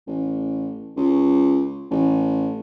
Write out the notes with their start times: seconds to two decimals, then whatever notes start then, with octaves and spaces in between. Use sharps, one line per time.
0.07 A1
0.97 C#2
1.91 A1